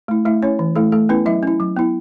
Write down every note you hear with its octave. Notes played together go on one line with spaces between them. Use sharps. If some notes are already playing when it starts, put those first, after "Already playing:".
A3 E4
A3 E4 E5
C#4 E4 C#5
E3
A3 E4 A4
A3 A4
B3 C#4 E4 B4
F#3 E4 E5
C#4 E4
F#3
B3 E4